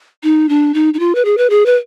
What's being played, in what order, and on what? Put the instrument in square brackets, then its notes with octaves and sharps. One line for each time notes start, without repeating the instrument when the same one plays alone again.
[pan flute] D#4
D4
D#4
D#4
F4
B4
G#4
B4
G#4
B4